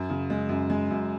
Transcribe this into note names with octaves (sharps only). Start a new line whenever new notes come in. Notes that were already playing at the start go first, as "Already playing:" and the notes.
Already playing: F#2
C#3
G#3
F#2
G#3
F#2